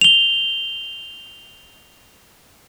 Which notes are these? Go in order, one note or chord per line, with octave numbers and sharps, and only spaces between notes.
F7 G7